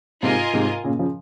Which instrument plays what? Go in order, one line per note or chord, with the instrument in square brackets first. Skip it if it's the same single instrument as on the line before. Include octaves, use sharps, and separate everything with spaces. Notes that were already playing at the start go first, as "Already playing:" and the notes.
[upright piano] G#2 C3 [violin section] F4 A#4 D#5 G#5
[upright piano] G#2 C3
A#2 C#3
C#3 F3